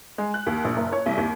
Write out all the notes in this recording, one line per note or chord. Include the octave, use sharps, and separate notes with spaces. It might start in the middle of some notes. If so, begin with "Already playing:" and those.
G#3
F#6
D#2
A#1
F#1
C#5
C2
D#2